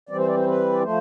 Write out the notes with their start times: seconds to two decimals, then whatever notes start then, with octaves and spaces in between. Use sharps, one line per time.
0.09 E3 G3 C4 D5
0.18 C5
0.27 D5
0.37 C5
0.46 B4
0.73 D5
0.83 F3 A3 C5